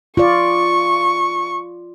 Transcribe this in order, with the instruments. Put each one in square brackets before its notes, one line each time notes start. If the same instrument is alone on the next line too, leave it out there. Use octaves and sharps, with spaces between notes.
[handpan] F4 D5 [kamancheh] C#6